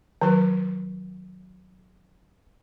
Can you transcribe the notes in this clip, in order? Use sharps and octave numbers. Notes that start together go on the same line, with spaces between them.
D#3 F#3 B4